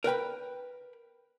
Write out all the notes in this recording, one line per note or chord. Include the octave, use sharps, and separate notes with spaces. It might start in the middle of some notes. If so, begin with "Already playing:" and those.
A#4 B4 G5 B5